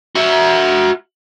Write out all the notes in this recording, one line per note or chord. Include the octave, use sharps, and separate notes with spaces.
F#4 E5